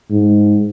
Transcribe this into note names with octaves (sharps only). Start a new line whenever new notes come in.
G#2